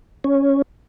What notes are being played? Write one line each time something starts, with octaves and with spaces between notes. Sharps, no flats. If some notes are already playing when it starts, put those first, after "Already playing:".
C#4